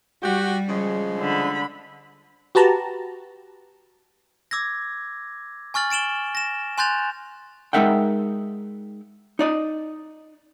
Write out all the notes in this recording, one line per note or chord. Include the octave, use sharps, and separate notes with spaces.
G3 F#4 G4
C#3 F3 G#3
D3 B5
F#4 G4 B4 A5 A#5
D6 E6 G#6 A#6
G#5 C#6 F6 A6 F#7
A6 D7 E7 F#7 G7
A#6 E7
G#5 C6 F#6 G6 A6 F7
G#3 D#4 A#4 E5 F#5 G5
D#4 D5 D#5